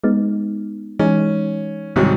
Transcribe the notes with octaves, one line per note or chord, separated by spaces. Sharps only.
G#3 B3 D#4
E3 G#3 C#4 D#4
C2 G#2 C3 D#3 F#3